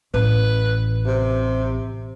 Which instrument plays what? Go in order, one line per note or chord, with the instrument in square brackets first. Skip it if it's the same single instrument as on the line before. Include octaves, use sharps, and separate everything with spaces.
[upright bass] A1 [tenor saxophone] B4
[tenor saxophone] C3